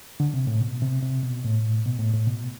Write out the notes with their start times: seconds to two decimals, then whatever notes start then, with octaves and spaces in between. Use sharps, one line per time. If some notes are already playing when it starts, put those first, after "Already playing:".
0.20 D3
0.34 C3
0.47 A2
0.62 B2
0.82 C3
1.02 C3
1.23 B2
1.44 A2
1.86 B2
1.99 A2
2.13 A2
2.27 B2